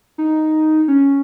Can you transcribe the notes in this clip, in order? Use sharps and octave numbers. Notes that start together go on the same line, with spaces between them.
D#4
C#4